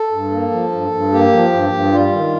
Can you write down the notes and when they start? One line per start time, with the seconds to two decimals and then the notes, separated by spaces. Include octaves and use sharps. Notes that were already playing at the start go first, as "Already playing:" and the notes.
Already playing: A4
0.12 G2
0.31 A#3
0.51 F3
0.71 G2
0.92 G2
1.12 A#3 G4
1.32 F3
1.53 G2
1.73 G2
1.92 G3 F4
2.12 D#3